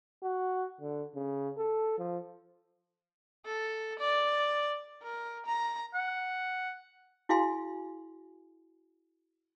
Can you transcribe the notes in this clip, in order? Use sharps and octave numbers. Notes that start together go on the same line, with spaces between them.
F#4
D3
C#3
A4
F3
A4
D5
A#4
A#5
F#5
E4 F#4 G#4 F5 G#5 C6